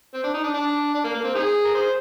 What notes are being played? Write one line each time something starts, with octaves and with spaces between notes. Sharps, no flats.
C4
D4
D#4
D4
D4
D4
A#3
A#3
C4
D#4 G#4
A#4
G#4 C5